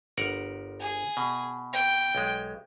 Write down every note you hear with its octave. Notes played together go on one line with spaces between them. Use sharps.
G1 A#4 F#5
G#4
B2
G5
B1 G#3